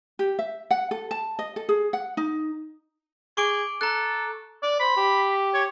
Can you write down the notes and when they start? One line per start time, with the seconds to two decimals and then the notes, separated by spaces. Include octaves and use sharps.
0.19 G4
0.39 E5
0.71 F#5
0.91 A4
1.11 A5
1.39 D#5
1.56 A4
1.69 G#4
1.93 F#5
2.17 D#4
3.37 G#4 C#6 D6 D7
3.81 A4 A#5 F#6
4.62 D5
4.80 C5 B5
4.97 G4
5.54 C#5